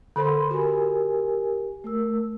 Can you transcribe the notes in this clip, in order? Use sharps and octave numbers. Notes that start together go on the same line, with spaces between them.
D3 A4 C5 B5 C6
F#4 G4 A#4 G#5
A3 A#4 E6